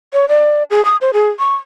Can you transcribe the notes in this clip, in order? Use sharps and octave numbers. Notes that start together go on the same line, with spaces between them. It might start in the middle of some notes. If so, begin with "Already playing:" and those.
C#5
D5
G#4
D#6
C5
G#4
C#6